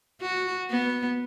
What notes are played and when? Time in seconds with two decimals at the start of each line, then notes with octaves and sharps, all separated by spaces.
0.21 F#4
0.70 B3